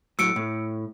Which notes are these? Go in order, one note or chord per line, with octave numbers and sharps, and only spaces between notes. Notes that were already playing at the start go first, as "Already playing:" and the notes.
A2 F#3 E6 C#7 D7
A2